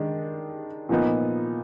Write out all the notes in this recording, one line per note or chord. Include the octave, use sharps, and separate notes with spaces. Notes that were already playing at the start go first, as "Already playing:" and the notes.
Already playing: D#3 G#3 D4
A#2 F3 B3 D#4